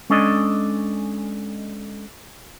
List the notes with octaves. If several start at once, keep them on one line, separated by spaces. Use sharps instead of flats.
G#3 C#4 D4 A4 D5 D#5